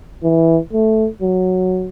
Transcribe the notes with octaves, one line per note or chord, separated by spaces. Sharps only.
E3
A3
F#3